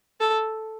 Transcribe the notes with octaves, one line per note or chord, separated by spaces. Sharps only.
A4